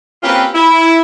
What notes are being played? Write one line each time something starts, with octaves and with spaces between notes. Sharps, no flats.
A#3 C4 C#4 F4 G4 B4
E4